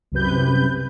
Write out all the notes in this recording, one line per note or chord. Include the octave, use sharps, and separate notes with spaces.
C2 F#2 C3 B4 G6